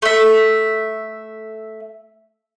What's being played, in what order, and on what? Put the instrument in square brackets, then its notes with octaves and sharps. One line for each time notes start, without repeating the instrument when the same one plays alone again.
[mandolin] A3 E5